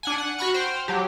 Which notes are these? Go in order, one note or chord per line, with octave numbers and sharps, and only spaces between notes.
D4 F#5 G#5
F#5
F#4 F#5 B5 C#6 F6
C5 G5 F6
F#3 G4